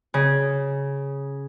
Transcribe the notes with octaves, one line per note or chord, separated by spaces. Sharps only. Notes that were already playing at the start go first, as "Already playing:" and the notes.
C#3